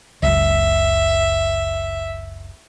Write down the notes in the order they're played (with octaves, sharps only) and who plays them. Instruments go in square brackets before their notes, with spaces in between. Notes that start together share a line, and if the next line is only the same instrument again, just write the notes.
[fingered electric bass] F#1 C#2 [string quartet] E5